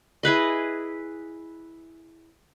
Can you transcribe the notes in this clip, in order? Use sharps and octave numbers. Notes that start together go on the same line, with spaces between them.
E4 G#4 B4 D#5